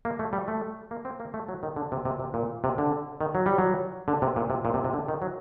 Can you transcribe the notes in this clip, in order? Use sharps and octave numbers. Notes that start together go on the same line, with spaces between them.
A#3
A3
G3
A3
A#3
C4
A#3
A3
F#3
D#3
D3
C3
C3
C3
A#2
C3
D3
D#3
F#3
G3
F#3
D3
C3
A#2
C3
A#2
C3
C3
D3
D#3
F#3